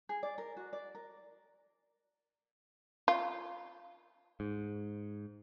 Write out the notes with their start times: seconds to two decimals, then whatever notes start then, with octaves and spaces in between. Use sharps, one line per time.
0.09 G#4
0.23 D5
0.38 A#4
0.57 F#4
0.73 D5
0.95 A#4
3.08 F4
4.40 G#2